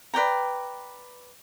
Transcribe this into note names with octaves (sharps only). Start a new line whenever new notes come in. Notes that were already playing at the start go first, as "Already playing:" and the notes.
B4 D5 G5 A#5